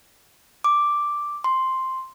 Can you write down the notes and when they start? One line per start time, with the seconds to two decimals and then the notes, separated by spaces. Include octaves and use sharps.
0.64 D6
1.44 C6